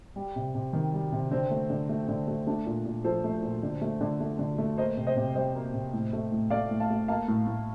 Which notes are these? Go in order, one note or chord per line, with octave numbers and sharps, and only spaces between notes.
G3
C3
C3
D#3
G3
C3
D3 C4
A3
D3
A3
D3
A3
A3 D4
A#2
A#2
F3 A4 C5
A3
A#2
D3
A3
D3
A3
D3
A3
A#3 C5 D#5
C3
C5 D#5
C3
G3 C5 D#5
A#3
C3
A2
A3
A2
A3 D5 F5
A2
F5 A5
A3
A#3 F5 A5
A2
A2